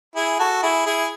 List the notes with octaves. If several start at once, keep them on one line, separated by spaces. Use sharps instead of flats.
E4 G#4
F#4 A4
E4 G#4
E4 G#4